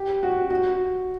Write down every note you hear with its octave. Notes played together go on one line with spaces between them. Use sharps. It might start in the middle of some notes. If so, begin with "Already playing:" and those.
Already playing: G4
F#4
F#4